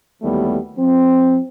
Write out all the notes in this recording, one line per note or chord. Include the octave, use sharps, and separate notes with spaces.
D#2 E3 F#3 G3 A3 B3
F3 C4